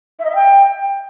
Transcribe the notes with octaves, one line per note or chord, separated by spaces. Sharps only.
E5
D#5
E5
G5